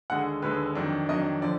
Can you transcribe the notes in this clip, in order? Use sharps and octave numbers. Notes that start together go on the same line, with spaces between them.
D#2 D3 G#3 F#5
D#2 D3 G#3 B4
F2 D#3 F#3 D4
F2 D#3 F#3 D4 D#5
D3 F3 D5